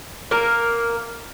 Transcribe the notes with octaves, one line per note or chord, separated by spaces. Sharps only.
A#3 A#4